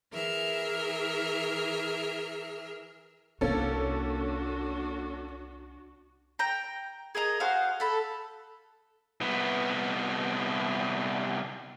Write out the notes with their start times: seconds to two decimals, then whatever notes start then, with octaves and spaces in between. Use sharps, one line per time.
0.13 E3 G#4 A#4 E5 F6
3.41 C2 A#3 C#4 D4 E4 F#4 A4
6.39 G5 A#5
7.15 G#4 A#4 D#5 A#5
7.40 F#4 G#4 C5 F5
7.80 A4 B5
9.21 C2 B3